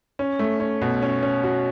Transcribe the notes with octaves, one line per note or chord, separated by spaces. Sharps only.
C#4
A3
C#4
B2
C#4
C#4
F#4